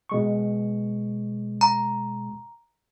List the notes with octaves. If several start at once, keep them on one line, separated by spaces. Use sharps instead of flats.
B2 G#3 C#6
A#5